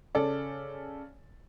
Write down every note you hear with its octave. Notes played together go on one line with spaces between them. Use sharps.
C#3 A4 D5